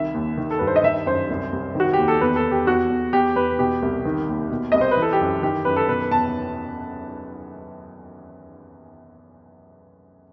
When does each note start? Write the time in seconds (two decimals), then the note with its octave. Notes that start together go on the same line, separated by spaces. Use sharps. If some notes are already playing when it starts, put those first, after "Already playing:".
Already playing: C2 D#3 E5
0.14 D#2
0.38 D#3
0.51 A4
0.59 G2 B4
0.67 C5
0.76 D#5
0.84 D#3 E5
1.06 F#2 C5
1.30 C2
1.52 C2
1.75 D#3 F#4
1.93 G4
1.98 D#2
2.08 A4
2.21 E2 B4
2.36 A4
2.44 E2
2.51 G4
2.67 E2 F#4
2.90 E2
3.13 E2 G4
3.36 E2 B4
3.59 B2 G4
3.82 C2
4.05 D#3
4.28 D#2
4.51 B2
4.72 C2 D#5
4.81 C5
4.91 B4
4.97 E3
5.02 A4
5.13 G4
5.20 F#2
5.43 D#3 G4
5.65 F#2 B4
5.76 A4
5.88 B2 B4
6.11 E2 A5